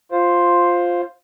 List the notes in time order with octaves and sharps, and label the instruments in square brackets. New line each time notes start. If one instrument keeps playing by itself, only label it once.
[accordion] F4 C5